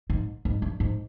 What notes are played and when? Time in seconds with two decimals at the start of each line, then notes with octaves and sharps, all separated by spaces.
0.10 G#2
0.45 G#2
0.62 G2
0.80 G#2